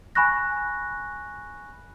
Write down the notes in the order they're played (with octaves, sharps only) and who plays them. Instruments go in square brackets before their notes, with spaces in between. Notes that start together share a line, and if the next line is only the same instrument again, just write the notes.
[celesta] G#5 B5 C#6 F#6 A#6